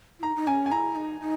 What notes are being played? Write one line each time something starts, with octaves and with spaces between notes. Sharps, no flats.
E4
D#4 A#5
D#4
C#4 G#5
G#5
E4 A#5
D#4
D#4